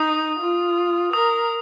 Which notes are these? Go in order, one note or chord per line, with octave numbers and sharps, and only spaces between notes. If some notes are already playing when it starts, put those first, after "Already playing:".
Already playing: D#4 D#6
F4
A#4 D#6